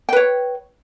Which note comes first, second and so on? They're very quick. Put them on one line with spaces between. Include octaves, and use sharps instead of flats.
G5 B4 C#5